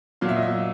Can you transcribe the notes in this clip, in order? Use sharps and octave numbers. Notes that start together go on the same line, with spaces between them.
A#2 F#3 F5
E5
D#5
E5